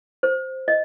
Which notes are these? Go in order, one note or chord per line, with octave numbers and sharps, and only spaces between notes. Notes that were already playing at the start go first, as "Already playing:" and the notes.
C5
D#5